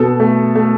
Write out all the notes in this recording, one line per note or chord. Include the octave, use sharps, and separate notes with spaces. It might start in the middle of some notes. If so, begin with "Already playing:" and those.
Already playing: B2 A4
A3
A3